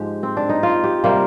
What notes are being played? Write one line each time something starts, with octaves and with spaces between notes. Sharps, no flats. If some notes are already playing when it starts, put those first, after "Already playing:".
Already playing: G#2 F3 G#3 G4
C4
D4
D#4
F4
G4
C3 G3 A#3 C5